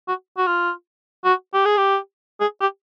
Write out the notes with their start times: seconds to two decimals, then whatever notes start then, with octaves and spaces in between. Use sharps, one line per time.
0.08 F#4
0.37 F#4
0.47 F4
1.25 F#4
1.54 G4
1.66 G#4
1.77 G4
2.41 G#4
2.61 G4